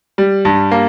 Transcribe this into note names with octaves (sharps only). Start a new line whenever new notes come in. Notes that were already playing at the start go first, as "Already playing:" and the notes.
G3
G2
A#3